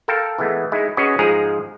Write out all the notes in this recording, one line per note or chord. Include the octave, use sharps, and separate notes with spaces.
A4 A#4 F5 G5 A5 A#5
E3 G#3 A3 B3
G#3 D#4 E4
C#4 F#4 G#4 B4 D#5
G#2 F3 G#3 G#4 A#5